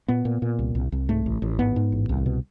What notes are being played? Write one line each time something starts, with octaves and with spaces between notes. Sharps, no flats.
A#2 B3
A#2
A#2
C2
C2
C2
G#2 A3
A1
A1
G#2 B3
G#2
A1
C2
B2